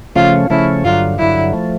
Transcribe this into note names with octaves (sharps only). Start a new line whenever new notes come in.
C#3 F3 A3 C#4 F4
C#3 F3 A3 C#4 E4
G2 D3 F#3 F4
G2 D3 F#3 E4
F3 A3